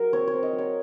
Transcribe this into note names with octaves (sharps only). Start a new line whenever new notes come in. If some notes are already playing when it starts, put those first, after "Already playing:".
Already playing: F#3 A#4
C4 C#5
C#5
C4
D#5
F#3
C#5